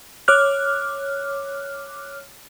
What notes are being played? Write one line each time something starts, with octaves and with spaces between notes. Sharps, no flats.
C#5 D6 F6 F#6